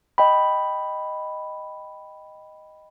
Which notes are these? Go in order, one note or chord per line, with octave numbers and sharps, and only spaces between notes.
D#5 G5 B5